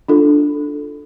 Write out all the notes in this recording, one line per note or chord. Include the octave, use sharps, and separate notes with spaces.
D4 F4 A4